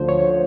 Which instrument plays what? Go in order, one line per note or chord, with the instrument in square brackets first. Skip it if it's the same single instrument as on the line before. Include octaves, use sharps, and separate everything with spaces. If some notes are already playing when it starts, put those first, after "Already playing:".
Already playing: [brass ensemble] D2 D3 F3 [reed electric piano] C5
[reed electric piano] C#5